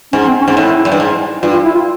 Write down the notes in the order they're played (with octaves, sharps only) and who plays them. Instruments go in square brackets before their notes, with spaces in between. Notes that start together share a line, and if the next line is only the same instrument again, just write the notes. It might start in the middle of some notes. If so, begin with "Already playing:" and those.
[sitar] G#2 [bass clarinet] C#4
[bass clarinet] C4
C#4
[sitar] G#2
[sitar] A2 [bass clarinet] E4
[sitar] F#2
G2
G#2
[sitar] G2 [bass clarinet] F4
[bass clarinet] F4
E4
F4